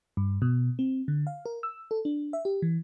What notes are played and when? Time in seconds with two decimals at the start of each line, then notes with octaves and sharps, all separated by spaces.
0.17 G2
0.42 B2
0.79 C4
1.08 D3
1.27 F5
1.45 A#4
1.63 E6
1.91 A4
2.05 D4
2.33 E5
2.45 G4
2.62 E3